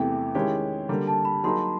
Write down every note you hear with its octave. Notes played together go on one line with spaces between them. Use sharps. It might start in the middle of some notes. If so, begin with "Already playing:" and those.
Already playing: E2 C3 E3 A3 G5
D#3 G#3 C#4 E4 G4
D3 G3 A#3
A5
B5
F#3 A#3 D#4 G#4 C6